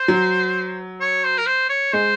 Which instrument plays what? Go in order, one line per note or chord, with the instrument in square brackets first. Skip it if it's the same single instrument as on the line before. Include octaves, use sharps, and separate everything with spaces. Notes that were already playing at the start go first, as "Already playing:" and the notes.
Already playing: [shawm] C5
[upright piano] F#3
[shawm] C#5
C5
A#4
C5
C#5
[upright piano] G#3 [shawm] C5